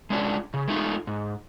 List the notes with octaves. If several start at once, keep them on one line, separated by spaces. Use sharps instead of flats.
G#3 C#4 D4 E4 F4
C#3
G#3 A3 D#4 F4
G#2